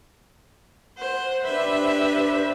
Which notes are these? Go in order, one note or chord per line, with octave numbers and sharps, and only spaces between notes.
C5 F#5
D4 G4 B4 C5 E5 B5